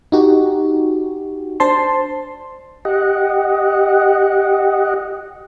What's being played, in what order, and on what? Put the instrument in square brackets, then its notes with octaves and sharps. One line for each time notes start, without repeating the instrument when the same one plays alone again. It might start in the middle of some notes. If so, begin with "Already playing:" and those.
[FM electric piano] D#4 F#4 G4
D4 C5 A5 C6
[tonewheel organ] G4 D#5 F#5